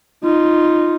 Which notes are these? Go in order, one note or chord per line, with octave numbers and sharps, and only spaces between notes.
D#4 F4